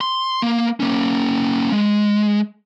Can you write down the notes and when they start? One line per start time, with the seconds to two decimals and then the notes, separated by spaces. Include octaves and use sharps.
0.01 C6
0.42 A#3
0.80 A#3 C#4
1.72 G#3